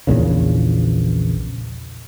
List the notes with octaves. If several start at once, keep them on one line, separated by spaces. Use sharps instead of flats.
A#1 E2 A#2 C#3